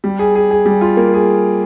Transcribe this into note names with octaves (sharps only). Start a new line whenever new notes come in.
G3
G#4
G#4
G#4
G3
F4
A#3
G#4